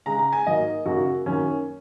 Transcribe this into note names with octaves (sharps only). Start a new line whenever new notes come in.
C#3 G#3 A#5
A#5
G#5
G#2 F#3 A#3 D#5
F#2 C#3 A#3 F#4
F#2 D#3 F#3 A#3 C#4